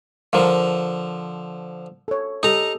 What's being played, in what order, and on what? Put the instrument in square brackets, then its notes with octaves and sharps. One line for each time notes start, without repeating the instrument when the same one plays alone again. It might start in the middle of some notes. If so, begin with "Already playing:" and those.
[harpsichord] D3 F3 [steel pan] A#4 F5
[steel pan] A4 C#5
[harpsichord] D#4 A#5 [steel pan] G4 A4 D#6